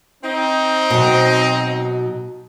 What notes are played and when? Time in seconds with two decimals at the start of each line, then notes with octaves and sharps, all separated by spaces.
0.24 C4 D#4
0.90 B2 F#3